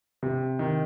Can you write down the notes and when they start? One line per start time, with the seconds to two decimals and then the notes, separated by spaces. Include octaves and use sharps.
0.23 C3
0.59 D#3